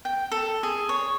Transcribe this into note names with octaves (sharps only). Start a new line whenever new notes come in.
G5
A4
G#4
C#5